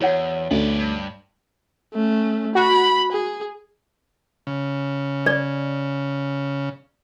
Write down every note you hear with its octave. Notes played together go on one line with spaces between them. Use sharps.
E2 F#4 C#5 F#5
D2 B3 D5
G2
A3 C#4
F#4 B5
G#4
C#3
D5